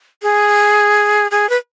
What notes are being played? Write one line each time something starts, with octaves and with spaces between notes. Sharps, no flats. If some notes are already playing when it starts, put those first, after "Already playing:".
G#4
G#4
B4